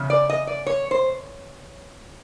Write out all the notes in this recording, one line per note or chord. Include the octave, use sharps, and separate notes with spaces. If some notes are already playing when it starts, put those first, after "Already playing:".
Already playing: E2 C#3
D5
D#5
D5
C#5
C5